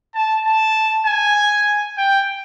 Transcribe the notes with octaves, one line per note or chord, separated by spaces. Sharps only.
A5
A5
G#5
G5